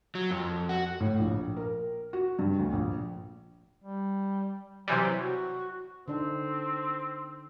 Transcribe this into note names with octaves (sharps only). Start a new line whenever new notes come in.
F#3
F2
F#4
A2
A#1
A#4
F#4
G2
D2
A#1
G3
C3 E3 F#3 G3
F#4
D3 C4 D4 D#4